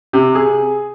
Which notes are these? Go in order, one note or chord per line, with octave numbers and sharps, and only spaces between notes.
C3
G#4